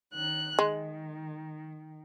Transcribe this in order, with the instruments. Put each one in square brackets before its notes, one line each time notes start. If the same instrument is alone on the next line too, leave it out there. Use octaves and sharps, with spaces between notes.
[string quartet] D#3 F#6
[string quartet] D#3 [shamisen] G#3